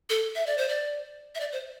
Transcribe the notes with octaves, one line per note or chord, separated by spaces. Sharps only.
A4
E5
D5
C5
D5
E5
D5
C5